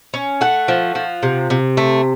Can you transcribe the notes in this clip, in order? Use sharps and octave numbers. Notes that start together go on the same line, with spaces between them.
C#4
A3 F#5
F3
F3
C3
C3
A3